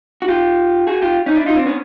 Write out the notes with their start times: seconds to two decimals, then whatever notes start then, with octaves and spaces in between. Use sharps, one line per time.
0.22 F#4
0.28 F4 G4
0.87 F#4 G#4
1.02 F4 G4
1.26 C#4 D#4
1.36 D4 E4
1.46 D#4 F4
1.56 C4 D4
1.66 B3 C#4